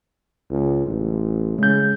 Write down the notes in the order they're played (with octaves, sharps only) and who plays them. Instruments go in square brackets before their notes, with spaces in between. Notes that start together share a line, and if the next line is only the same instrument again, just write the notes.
[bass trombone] C#2
A1
[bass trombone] C#3 [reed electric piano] G#3 G6